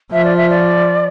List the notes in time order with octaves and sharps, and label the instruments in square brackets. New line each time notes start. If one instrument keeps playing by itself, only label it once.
[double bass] F3 [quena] E5
[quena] D5
E5
D5